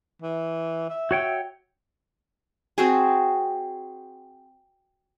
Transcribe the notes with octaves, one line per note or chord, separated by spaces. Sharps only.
E3
E5
F#4 C#5 G5
C4 F#4 G#4